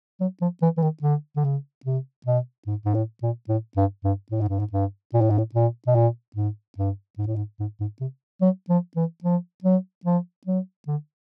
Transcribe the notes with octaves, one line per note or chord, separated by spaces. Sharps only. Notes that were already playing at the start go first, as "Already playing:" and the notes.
F#3
F3
E3
E3
D#3
D3
D3
C#3
C3
B2
G#2
G#2
A2
A#2
A2
G2
G2
A2
G#2
G2
G#2
G2
A#2
A2
G#2
A2
A#2
B2
A#2
G#2
G2
G#2
A2
G#2
G#2
G#2
C3
F#3
F3
E3
F3
F#3
F3
F#3
D3